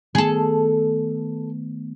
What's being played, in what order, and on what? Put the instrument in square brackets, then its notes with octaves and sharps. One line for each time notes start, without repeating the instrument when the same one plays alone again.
[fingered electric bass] D#3 A3 B3 [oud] G#4 A4